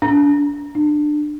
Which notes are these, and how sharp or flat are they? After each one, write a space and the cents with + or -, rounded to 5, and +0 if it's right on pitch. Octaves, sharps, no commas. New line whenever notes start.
D4 -30
D4 +25